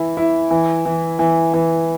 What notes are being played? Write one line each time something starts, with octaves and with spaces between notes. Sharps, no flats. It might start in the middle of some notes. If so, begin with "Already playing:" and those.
Already playing: E3 E4
E4
E3
E3
E3
E3